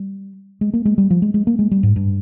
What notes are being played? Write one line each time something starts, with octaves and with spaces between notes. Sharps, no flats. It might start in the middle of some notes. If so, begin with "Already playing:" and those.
Already playing: G3
G#3
A#3
G#3
G3
F3
G#3
G#3
A#3
G#3
G3
G#2
G2